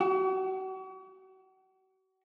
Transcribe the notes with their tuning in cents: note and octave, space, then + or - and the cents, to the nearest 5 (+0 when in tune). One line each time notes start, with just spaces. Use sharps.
F#4 +40